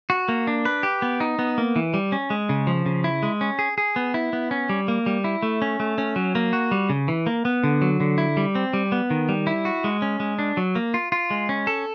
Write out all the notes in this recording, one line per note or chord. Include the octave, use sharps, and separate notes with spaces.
F#4
A#3
D4
B4
G4
B3
D#4
B3
A#3
E3
G3
C#4
G#3
C#3
F3
C#3
E4
G#3
C#4
G#4
G#4
B3
E4
B3
C#4
G3
A#3
G3
E4
A3
C#4
A3
C#4
F#3
A#3
F#4
G3
C#3
E3
A#3
B3
D3
F#3
D3
E4
G3
C4
G3
B3
D#3
G3
E4
F#4
G#3
C#4
G#3
D4
F#3
A#3
F4
F4
G#3
C#4
A4